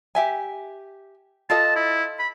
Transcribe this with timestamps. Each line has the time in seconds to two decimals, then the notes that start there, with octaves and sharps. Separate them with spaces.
0.15 G4 E5 G#5
1.50 F4 A4 D#5 A5
1.76 E4
2.19 B5